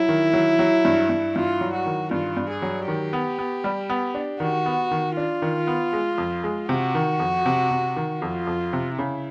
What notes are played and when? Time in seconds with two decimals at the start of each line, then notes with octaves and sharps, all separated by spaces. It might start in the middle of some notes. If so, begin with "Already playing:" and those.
Already playing: F#3 E4
0.09 D#3
0.33 F#3
0.59 F#3
0.85 G2
1.10 G2
1.35 G2 F4
1.61 F#3
1.73 F#4
1.86 D#3
2.11 G2 F4
2.37 G2
2.50 G#4
2.62 F#3
2.88 D#3 G4
3.13 B3
3.39 B3
3.64 G3
3.90 B3
4.14 D4
4.40 D#3 F#4
4.66 B3
4.91 D#3
5.17 D4 F4
5.42 D#3
5.67 B3
5.93 G#3
6.18 F2
6.44 G#3
6.69 C3 F#4
6.95 D#3
7.20 F2
7.46 C3
7.71 C3
7.96 D#3
8.22 F2 F4
8.47 F2
8.73 C3
8.98 C#3 E4